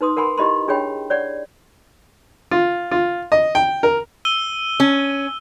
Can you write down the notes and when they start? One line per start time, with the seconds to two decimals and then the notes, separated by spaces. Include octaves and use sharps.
0.01 D#4 B4 C6 D#6
0.17 A#4 F#5 G#5 B5 C6
0.38 E4 G4 D#5 B5 C6
0.68 D4 G#4 C#5 G5 B5
1.10 C#5 D5 F#5
2.51 F4
2.91 F4
3.32 D#5
3.55 G5
3.83 A#4
4.25 E6 D#7 G7
4.80 C#4